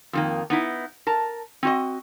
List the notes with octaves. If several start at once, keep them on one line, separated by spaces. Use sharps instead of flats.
F2 D#3 A#3
B3 D#4 E4
A#4 A5
C4 F#4 D#5